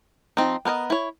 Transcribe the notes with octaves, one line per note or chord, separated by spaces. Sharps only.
F3 C4 D#4
B3 A#4 C5 D#5
E4 C#5